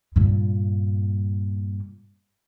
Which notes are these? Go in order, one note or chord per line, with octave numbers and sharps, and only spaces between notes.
G2 A#2